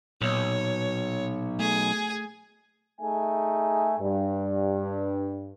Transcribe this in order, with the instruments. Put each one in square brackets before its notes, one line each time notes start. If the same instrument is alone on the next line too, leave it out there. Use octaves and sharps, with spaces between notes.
[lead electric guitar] B1 [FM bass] A#2 [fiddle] C#5
[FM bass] A3 [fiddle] G#4 G#5
[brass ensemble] A3 D#4 G#4 E5 G#5
G2